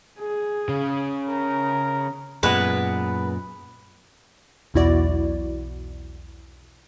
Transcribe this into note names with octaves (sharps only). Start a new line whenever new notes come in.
G#4
C#3
A#4
F#2 A#2 G#3 B3 B4
B1 E2 E4 F#4 D5